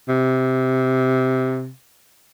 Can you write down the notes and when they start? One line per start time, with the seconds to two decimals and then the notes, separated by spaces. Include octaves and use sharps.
0.09 C3